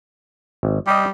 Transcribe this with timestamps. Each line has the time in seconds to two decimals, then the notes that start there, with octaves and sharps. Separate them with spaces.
0.63 G#1
0.87 G3 G4 D#5